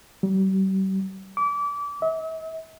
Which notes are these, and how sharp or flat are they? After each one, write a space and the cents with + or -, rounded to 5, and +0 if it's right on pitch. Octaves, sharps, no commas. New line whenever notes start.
G3 -40
D6 -30
E5 -45